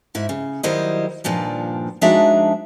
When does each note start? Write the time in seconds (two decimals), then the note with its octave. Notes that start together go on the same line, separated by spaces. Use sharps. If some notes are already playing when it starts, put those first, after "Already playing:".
0.15 G#2 E4 E5
0.29 C#3
0.63 D#3 F#3 G3 E4 C5 D#5
1.24 G2 A#2 D#3 F3 D4
2.01 F3 G#3 D4 D#4 F#4 E5